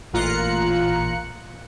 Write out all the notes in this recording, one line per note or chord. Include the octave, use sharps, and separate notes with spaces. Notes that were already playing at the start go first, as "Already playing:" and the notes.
A1 A#2 F4 A#5 F#6 C#7